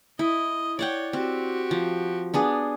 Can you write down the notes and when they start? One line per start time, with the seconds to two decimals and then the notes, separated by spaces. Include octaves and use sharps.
0.19 E4 D#5
0.79 C#5 D5 F#5 G5
1.13 C4 F#4 G4
1.71 F3
2.34 B3 D4 G#4